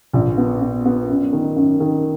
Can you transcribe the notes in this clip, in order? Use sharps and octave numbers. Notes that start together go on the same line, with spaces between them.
A#1
B3
B3
B3
F#2
D#3
F#2
D#3